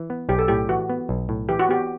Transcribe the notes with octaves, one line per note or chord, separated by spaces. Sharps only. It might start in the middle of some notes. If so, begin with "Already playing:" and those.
Already playing: E3
B3
B1 G4
A4
A2 G4
E3 F#4
B3
B1
A2
E3 G4
F#4
B3 G4